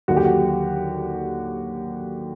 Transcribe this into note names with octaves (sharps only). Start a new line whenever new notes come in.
D#2 D3 F#3 F#4
G4
F#4